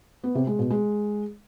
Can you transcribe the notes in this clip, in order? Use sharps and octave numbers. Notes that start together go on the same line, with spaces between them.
B3
C3
G#3
B2
G#3